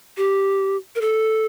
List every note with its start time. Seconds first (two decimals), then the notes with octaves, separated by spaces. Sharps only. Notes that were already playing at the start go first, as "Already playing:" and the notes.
0.17 G4
0.95 A#4
1.01 A4